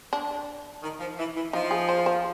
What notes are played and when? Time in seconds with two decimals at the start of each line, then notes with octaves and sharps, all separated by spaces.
0.13 D4
0.83 D#3
1.00 F3
1.18 E3
1.36 E3
1.53 F3 D#4
1.71 G#4
1.89 C5
2.06 C5